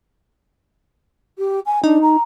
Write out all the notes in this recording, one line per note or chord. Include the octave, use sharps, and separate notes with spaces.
G4
G#5
D4 D#4
A#5